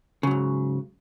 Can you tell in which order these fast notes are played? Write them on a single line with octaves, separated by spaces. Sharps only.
C#3 F#3 G#2